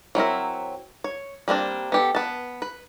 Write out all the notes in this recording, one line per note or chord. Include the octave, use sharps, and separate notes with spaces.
F#3 C4 E4 A#4
C#5
G3 A#3 C4 D4
B3 G4 A4
B3 A5
B4